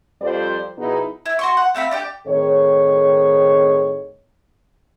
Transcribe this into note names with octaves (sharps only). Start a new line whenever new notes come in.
F2 F3 G3 A4 C5 D5
B2 F3 B3 D#4 E4 G#4
E4
F#4 C6 C#6
F#5
A3 C4 F5 B5
D4 G4 G5
A2 D#3 C4 G#4 C#5